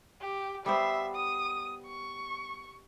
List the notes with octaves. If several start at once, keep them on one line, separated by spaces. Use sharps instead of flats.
G4
G3 B3 C5 E5
D#6
C#6